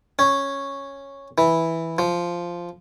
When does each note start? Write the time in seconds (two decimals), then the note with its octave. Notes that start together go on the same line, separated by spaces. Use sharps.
0.19 C#4
1.38 E3
1.98 F3